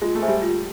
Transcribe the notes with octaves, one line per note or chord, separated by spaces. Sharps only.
G#3 F4
A3
G#4 C5 E5 G#5
G3
F4